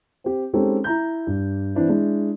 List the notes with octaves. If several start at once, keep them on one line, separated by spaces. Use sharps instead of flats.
C4 G4
G#3 C4 C#4 D#4 G4 A4
E4 A#5 G6
G2
E3 C4 D4 E4
G#3 D4 E4